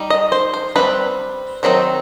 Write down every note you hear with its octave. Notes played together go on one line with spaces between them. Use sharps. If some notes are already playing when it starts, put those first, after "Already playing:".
Already playing: G3 D#4
D#5
C5
C5
G3 C4 D#4 B4
D#3 F#3 C4 D#4